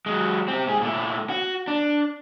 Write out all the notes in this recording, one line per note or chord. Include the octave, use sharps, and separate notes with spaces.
F#3 G#3
C4 G4
G#2 G#4
A#2 A3
F#4
D4